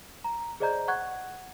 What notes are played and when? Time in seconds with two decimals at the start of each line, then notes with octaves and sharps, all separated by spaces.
0.24 A#5
0.60 G#4 C5 D5 D#5 A#5 G6
0.88 F#5 C#6 F#6 G#6